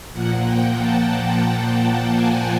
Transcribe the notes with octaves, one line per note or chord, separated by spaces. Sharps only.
A#2 F3 A#3 F#5
G5
A5
G#5